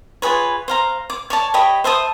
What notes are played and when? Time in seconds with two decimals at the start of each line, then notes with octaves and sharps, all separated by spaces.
0.22 F4 G#4 B4 C#5
0.68 C5 F5 A#5
1.10 D6
1.30 C#5 D5 A5
1.54 G4 C#5 D#5 B5
1.84 C5 E5 A5 D#6